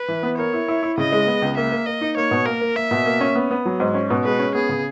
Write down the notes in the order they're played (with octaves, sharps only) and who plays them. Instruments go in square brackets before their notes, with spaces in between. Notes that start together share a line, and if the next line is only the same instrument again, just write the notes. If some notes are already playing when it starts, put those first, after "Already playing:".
Already playing: [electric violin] B4
[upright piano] E3
B3
[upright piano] A#4 [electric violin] C#5
[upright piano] E4
E4
E4
[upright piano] C#3 [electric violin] D#5
[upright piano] G#3
B3
C#2
[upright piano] A#3 [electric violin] E5
[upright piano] A#3
[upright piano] A#3 [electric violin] D#5
[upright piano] D#4
[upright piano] A#3 [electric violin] C#5
[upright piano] B2
[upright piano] A#3 [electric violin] A#4
[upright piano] A#3
[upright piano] A#3 [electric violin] E5
[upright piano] B2
A#3
C#4
B3
B3
F#3
G#2
C#4
B2
[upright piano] G#3 [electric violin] B4
[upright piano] C#4
[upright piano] B3 [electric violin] G#4
[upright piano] C#3